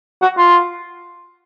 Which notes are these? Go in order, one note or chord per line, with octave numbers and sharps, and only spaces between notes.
F#4
F4